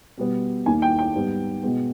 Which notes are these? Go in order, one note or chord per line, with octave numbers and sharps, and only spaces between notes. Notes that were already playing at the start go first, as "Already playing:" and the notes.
B2 G3 B3
D#2 D#3 A#3 G#5
G5
G5
G#2 G3 B3
B2 G#3 B3